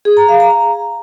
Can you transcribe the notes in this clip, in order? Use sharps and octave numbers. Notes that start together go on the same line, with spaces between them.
G#4
A#5
F5
A#5